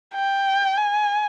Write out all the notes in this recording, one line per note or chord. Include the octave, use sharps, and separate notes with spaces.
G5
G#5